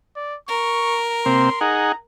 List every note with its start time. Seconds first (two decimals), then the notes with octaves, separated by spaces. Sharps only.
0.16 D5
0.48 A#4 C#6
1.26 C3 A#3 C4 C6
1.61 D#4 G#4 F#5 A#5